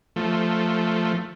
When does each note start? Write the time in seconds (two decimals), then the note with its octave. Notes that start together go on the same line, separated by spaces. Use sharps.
0.16 F3 A3